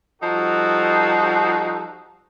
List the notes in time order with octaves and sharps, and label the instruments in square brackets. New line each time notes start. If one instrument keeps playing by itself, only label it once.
[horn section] F3 G3 D#4 F#4 A4